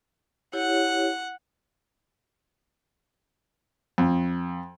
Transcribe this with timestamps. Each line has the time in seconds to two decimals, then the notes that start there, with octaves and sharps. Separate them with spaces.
0.53 E4 G4 C#5 F#5
3.98 F2